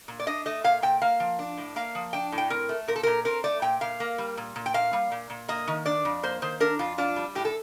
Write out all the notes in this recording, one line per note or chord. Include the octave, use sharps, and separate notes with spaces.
A#2
D5
D4 D#5
A3 D#5
A#2 F5
A#2 G5
A#3 F5
F3
D4
A2
A#3 F5
F3
D4 G5
A2
G5
C4 A#4
A3
A#2 A#4
A4
A#2 A#4
C4 A#4
A3 D5
A#2 G5
A#2 F5
A#3
G3
A#2
A#2
G5
A#3 F5
G3
A#2
A#2
A#3 D#5
D#3
D4 D5
F2
A#3 C5
D#3 C5
D4 A#4
F2 F4
D4 F4
G3
A2 G4
A4